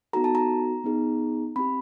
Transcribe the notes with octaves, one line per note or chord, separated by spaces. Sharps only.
B3 D#4 F#4 A4 A#5
A5
A#5
B3 D#4 G#4
C4 E4 G4 B5